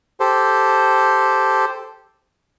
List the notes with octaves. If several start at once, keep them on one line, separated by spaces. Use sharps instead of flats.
G4 A4 C5